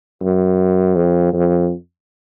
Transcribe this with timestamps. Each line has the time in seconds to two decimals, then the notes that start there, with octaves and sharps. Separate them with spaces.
0.22 F#2
0.96 F2
1.33 F2